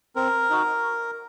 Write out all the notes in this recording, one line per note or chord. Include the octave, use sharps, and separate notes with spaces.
C4 A#4
D#4 F#4